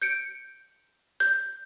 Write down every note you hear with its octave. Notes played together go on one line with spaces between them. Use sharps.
G6 C#7 D7
G6